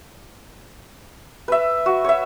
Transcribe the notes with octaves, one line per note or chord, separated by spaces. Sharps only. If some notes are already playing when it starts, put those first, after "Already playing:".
B4 E5
F#4
C#5 E5